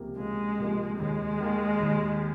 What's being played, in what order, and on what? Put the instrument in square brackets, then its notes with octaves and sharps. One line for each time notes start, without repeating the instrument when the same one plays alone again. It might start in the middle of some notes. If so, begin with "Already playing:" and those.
Already playing: [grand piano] C#2 C3 F3 A#3
[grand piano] C#2 [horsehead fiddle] G#3
[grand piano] C3 F3 A#3
[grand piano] D#2 [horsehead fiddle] G#3
[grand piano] D#3 A#3
D#2